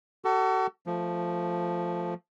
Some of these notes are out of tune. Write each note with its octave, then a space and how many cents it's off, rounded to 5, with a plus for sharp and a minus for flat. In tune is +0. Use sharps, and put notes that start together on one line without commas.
F#4 +40 A4 +25
F3 +0 A3 +5